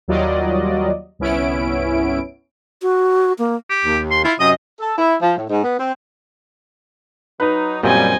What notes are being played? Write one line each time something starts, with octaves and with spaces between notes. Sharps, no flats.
D#2 F#3 G3 F4 D5 D#5
G1 C2 B3 C#4 E4 D7
F#4
A#3
G4
D#2
C6
E4 F4
F#2 C3 D#5 D#6
A4
E4
F3
A2
G#2
B3
C4
F#3 D#4 B4
F#2 A#2 C#3 G3 C4 D#5 G#5